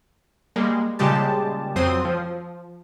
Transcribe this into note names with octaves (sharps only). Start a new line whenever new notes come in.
G3 G#3 A#3
A#2 C#3 G3 G#3 G4 A5
F2 F#3 C4 C6 D#6
F3